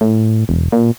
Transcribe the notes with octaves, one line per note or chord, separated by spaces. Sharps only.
A2
E1
A#2